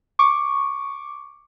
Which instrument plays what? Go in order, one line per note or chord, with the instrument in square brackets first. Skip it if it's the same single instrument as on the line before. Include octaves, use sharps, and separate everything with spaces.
[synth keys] C#6 D6